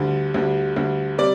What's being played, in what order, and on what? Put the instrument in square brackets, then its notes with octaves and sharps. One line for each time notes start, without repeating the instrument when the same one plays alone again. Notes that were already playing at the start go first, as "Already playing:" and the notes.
Already playing: [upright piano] D2 D3 G3
D2 D3 G3
D2 D3 G3
C3 G3 D5